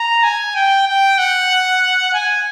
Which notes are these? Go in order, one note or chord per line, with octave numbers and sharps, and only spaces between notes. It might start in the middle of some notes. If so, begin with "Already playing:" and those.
Already playing: A#5
G#5
G5
G5
F#5
G#5